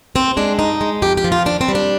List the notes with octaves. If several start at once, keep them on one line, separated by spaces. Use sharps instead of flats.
D#2 C4
G#3 D4
G2 D#4
G#3
F2 G4
G4
F3
F4
D#2 D4
C4
G3
D4